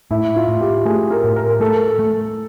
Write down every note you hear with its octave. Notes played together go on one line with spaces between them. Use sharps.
A2 E4
F4
A2
G4
A3 G#4
A#4
A2
A#4
A3 A4
A3